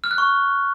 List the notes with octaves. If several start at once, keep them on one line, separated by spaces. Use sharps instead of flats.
F6
F#6
C#6